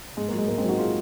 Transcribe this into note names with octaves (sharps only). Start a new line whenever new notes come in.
G#2 G#3
A#3
F#3
G#3
G#2 A#3
G#3 C4
F#3
D#4 F#4
F4 G#4